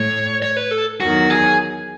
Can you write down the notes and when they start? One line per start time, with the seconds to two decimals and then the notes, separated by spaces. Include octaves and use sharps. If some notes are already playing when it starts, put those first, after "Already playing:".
Already playing: A2 C#5
0.42 C#5
0.57 B4
0.71 A4
1.00 E2 D#3 F#3 F#4
1.30 G#4